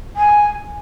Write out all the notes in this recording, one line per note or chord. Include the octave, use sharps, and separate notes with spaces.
G#5